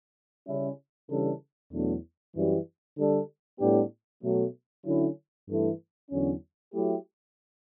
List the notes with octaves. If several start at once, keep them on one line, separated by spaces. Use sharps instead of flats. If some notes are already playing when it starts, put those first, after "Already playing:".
C#3 G3 C#4 E4
C#3 E3 G3 D4 A4
E2 B2 F#3 A3 D4
F#2 E3 G3
D3 G3 D4 A4
A2 G3 B3 D4 G4
B2 F#3 A3
D3 F#3 C#4 E4
G2 E3 A3 E4
E2 D3 F#3 C#4
F#3 A3 E4 G4